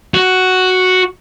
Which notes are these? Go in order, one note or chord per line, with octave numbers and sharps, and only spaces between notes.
F#4